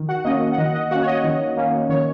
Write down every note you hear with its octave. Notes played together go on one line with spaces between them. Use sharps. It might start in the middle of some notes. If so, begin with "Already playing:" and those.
Already playing: D#3
F#4 F#5
A#3 C#4 D#5
F#5
D#3 D#5
F#5
D#5
A#3 C#4 F#4 F#5
C#5
D#5
D#3
A#3 C#4
D#3 C#5